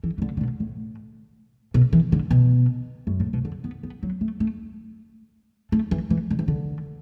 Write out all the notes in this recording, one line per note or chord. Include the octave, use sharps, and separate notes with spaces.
E3
E3
D3
D3
B2
A2
B2
E3
D3
B2
F#2
A2
B2
D3
B3
B3
F#3
A3
A3
A3
E3
E3
D3
E3
D3